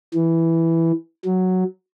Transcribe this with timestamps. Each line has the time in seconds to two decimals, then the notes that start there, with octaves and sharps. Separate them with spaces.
0.14 E3
1.25 F#3